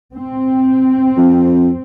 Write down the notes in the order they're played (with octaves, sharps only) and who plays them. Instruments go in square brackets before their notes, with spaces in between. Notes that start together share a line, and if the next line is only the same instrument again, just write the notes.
[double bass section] C4
[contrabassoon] F2